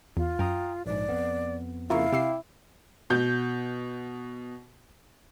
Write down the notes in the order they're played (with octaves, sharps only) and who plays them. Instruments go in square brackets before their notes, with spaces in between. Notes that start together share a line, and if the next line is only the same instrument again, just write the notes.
[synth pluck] E2 [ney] F4
[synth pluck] F#2 [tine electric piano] G5 A#5 D#6
[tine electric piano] A#1 G#2 [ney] D5
[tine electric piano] F2 B3
[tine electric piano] F2 C#3 A#3 [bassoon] E4 [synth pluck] F4 A#4 C#6 [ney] F5
[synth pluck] C3 E6 C7 [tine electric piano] G5 D6
[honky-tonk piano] B2 G6